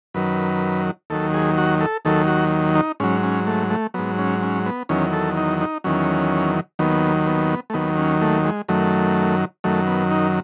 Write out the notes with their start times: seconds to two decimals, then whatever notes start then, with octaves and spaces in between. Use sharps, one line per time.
0.14 F#2 D#3 F#3 B4
1.10 D#2 D#3 F#3 A4
1.34 G#4
1.58 F#4
1.81 A4
2.05 D#2 D#3 F#3 A4
2.28 F#4
2.75 D#4
3.00 G#2 F#3 C#4
3.23 C#4
3.47 A3
3.70 A3
3.94 G#2 F#3 B3
4.19 C#4
4.43 C#4
4.66 B3
4.89 E2 D#3 F#3 C#4
5.13 A4
5.37 D#4
5.61 D#4
5.84 E2 D#3 F#3 C#4
6.79 D#2 D#3 F#3 B3
7.27 B3
7.70 A3
7.74 D#2 D#3 F#3 B3
7.98 C#4
8.22 A3
8.45 G#3
8.68 F#2 D#3 F#3 A3
9.64 F#2 D#3 F#3 A3
9.87 B3
10.11 D#4